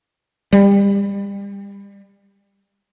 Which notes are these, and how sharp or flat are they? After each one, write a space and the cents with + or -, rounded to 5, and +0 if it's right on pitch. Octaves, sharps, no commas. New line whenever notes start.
G3 +30